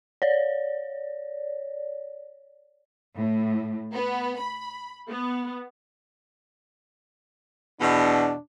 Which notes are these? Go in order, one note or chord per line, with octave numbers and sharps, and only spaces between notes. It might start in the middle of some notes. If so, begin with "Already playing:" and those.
C#5 D5
A2
B3
B5
B3
E2 B2 D4